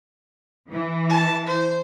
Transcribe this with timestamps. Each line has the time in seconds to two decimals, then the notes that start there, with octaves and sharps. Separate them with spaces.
0.71 E3
1.10 A5
1.47 C5